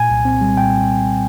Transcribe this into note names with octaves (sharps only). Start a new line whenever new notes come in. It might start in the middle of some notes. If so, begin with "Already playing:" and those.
Already playing: A#2 G#5
C2
C4
G3
A#2 G5